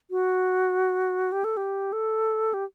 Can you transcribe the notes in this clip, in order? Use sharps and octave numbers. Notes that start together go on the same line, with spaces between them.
F#4
G4
A4
G4
A4
G4